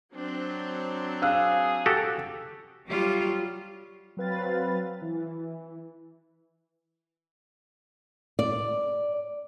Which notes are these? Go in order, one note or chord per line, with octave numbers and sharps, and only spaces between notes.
F#3 C4 D4
G#4 F5 E6 F#6
F#4 G4 A4
F#3 G3 F4
F#3 C4 B4 F5 A6
E3
D5